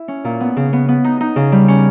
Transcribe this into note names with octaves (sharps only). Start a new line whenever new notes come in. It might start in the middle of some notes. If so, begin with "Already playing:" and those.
Already playing: E4
C#4
A#2
B3
C#3
B3
B3
D#4
D#4
C#3
G3
C#4